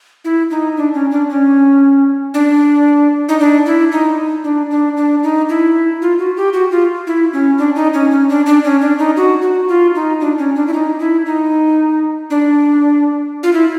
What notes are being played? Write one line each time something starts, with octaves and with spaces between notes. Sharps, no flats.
E4
D#4
D4
C#4
D4
C#4
D4
D#4
D4
E4
D#4
D4
D4
D4
D#4
E4
F4
F#4
G4
F#4
F4
E4
C#4
D4
D#4
C#4
C#4
D4
D4
C#4
D4
D#4
F#4
F#4
F4
D#4
D4
C#4
D4
E4
D#4
E4
D#4
D4
F4
E4